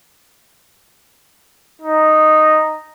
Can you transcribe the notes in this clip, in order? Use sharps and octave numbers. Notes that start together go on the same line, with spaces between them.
D#4